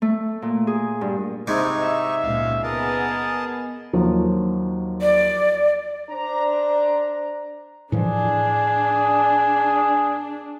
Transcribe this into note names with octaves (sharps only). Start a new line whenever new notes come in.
A3
A#2
G#4
G2
G#2 C3 G#3 D#4 E4 C#6
E5
C#2 A#2 F5
B3 G#4 A#4 D#5 A5
D#2 F3 F#3
D5
D4 C5 D5 A#5
A2 E3 F3 D4 G#4